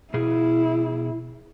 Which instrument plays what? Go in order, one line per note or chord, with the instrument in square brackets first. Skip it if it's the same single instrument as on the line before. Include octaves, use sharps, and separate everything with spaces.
[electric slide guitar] B2 G#4 [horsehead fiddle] E4